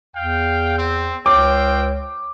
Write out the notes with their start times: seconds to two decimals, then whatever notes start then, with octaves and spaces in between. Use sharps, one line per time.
0.16 E2 F5 G5
0.78 C4
1.26 C#2 C4 C#5 F5 G5 D6